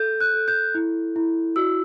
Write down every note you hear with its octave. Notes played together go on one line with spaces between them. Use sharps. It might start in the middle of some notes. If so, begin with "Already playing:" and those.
Already playing: A4 G6
F#6
A4
G6
E4
E4
F#4 E6